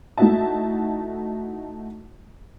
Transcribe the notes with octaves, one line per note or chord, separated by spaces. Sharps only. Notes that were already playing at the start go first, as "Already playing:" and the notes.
A3 D#4 E4 F#4 E5 A5